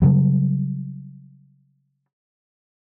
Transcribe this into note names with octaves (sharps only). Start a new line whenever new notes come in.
C#3 F#3 G3